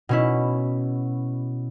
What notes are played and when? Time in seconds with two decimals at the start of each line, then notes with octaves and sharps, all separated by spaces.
0.09 B2 C#4 E4